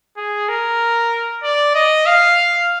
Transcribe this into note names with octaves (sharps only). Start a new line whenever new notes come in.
G#4
A#4
D5
D#5
F5